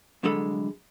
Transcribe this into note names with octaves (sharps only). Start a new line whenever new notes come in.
C2 D3 F#3 G#3 A4 B5